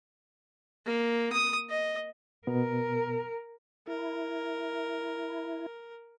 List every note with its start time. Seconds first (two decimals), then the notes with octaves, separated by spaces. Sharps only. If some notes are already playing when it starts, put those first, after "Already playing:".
0.86 A#3
1.32 D#6
1.70 D#5
2.47 B2 B3 A#4
3.87 E4 A#4